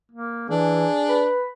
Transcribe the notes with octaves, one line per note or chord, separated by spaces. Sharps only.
A#3
E3 D4 G#4
B4